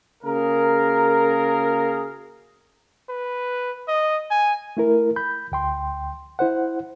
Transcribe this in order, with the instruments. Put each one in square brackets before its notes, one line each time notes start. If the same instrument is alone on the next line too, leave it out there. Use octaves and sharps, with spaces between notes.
[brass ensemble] C#3 A#3 F#4 G#4 A#4
[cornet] B4
D#5
G#5
[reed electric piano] A3 E4 A#4
B5 G6
D2 G5 C6
E4 C5 F#5